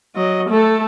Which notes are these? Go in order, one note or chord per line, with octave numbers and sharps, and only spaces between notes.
F#3 D#5
A3 A4